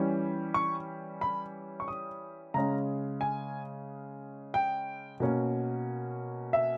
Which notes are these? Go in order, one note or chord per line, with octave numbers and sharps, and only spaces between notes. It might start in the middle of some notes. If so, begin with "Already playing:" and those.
Already playing: E3 G3 C#4
C#6
B5
C#6
D#6
C#3 G#3 C#4 A#5
G#5
G5
B2 A#3 C#4
E5